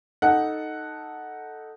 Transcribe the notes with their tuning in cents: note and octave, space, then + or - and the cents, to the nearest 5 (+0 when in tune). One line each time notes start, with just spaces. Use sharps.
D#4 +0 A4 +0 F#5 +0